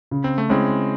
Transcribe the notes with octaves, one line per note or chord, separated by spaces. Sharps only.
C#3
C4
A3
G#3 C4 C#4 E4